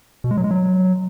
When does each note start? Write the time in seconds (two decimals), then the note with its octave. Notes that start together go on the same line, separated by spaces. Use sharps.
0.24 B2
0.31 G#3
0.37 F#3
0.44 G#3
0.51 F#3